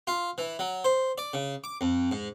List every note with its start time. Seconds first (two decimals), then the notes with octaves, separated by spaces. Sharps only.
0.07 F4
0.38 E3
0.59 F#3
0.84 C5
1.18 D5
1.33 C#3
1.64 D6
1.81 F2
2.11 G#2